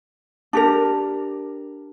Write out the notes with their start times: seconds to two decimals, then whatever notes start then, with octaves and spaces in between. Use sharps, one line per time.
0.53 D4 G4 A#4